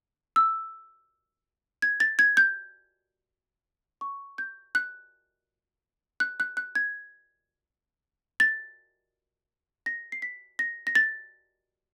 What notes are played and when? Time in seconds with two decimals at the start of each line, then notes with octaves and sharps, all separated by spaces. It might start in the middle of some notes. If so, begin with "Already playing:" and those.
0.36 E6
1.82 G#6
2.00 A6
2.19 G#6
2.37 G6
4.01 C#6
4.38 G6
4.75 F#6
6.20 F#6
6.40 F#6
6.57 F#6
6.75 G#6
8.40 A6
9.86 A#6
10.12 C7
10.22 B6
10.59 A#6
10.87 A#6
10.95 A6